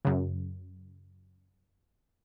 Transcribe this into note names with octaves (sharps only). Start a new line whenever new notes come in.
F#2 C#3